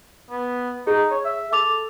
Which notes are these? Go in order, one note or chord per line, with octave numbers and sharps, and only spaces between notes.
B3
D#4 G#4
C#5
E5
A4 D6 F7